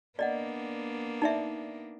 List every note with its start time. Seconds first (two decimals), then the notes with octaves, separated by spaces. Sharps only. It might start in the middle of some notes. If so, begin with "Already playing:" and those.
0.19 A#3 B3 D4 D5 D#5 F#5
1.22 D#4 D5 E5